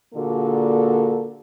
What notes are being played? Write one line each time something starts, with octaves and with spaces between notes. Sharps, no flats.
A#2 D3 A#3 F#4 G#4 A4